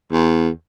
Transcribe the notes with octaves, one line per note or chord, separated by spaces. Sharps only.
E2